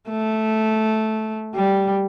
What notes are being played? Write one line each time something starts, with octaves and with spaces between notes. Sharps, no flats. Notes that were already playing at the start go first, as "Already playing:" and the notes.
A3
G3